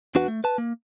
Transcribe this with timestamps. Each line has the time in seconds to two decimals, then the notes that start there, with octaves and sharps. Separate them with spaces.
0.15 E2 D4 F#4 B4 F#5
0.28 A3
0.44 B4 A5
0.58 A#3